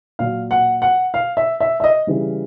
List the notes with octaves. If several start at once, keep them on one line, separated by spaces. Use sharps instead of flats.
A#2 F#3 F5
F#5
F#5
F5
E5
E5
E5
D#5
C#3 E3 G3